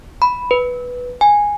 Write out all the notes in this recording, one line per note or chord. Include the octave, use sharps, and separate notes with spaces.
B5
B4
G#5